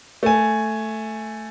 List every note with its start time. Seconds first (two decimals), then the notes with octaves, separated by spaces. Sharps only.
0.23 A3 G#5